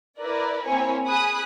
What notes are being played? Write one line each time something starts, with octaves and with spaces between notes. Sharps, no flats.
E4 A#4 B4 D5
A#3 C4 E4 C#5 G#5
G#4 G#5 B5 D#6 F#6